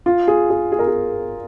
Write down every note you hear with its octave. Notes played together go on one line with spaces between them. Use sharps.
F4
G#4
G#4
G#4
A#4
G#4